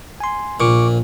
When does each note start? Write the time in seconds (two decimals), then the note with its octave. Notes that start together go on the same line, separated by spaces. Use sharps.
0.20 G#5 C6
0.60 A#1 A#2 F4 C#6 D6